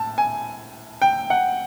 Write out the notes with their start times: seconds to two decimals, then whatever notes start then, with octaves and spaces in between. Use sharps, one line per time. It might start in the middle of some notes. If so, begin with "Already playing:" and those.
Already playing: A2 A5
0.18 G#5
1.02 G5
1.30 F#5